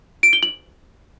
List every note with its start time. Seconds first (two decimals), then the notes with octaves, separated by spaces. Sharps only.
0.23 D7
0.33 G7
0.43 F#7